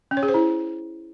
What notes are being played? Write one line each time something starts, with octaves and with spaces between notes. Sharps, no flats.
C#4
C#5
G#4
C5
E4